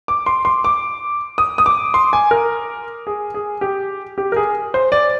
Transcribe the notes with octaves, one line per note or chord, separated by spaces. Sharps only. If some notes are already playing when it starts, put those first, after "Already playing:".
D6
C6
C6
D6
D#6
D#6
D6
C6
G#5
A#4
G#4
G#4
G4
G4
A#4
G#4
C5
D5